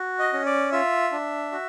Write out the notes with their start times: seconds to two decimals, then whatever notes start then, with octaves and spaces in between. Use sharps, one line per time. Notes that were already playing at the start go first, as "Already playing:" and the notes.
Already playing: F#4
0.19 D#5
0.33 C#4
0.46 D5
0.72 F4 E5
1.12 D4
1.52 F#4